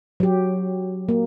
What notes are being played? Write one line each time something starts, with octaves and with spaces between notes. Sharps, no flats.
F#3 G4
A#3